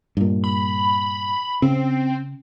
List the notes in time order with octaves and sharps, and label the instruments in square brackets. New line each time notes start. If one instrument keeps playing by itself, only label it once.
[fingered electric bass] G2 A#2
[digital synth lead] B5
[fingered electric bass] C#3 [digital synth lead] C4